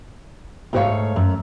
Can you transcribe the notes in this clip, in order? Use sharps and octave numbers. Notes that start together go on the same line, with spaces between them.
G#2 A3 F#4 A#4 C#5 F5
F#2